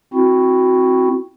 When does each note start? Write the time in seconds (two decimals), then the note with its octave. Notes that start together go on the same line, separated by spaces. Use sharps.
0.14 C4 E4 F#4